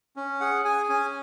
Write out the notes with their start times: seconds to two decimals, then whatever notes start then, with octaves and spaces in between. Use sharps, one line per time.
0.16 C#4
0.40 G#4 F#5
0.65 G#4 G#5
0.89 C#4 G#5